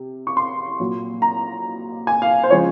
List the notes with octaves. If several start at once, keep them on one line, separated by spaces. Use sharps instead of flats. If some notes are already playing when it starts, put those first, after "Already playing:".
Already playing: C3
C#6
C6
A#2 F#3
A#5
G#5
F5
C5
C#3 F3 G#3 C#5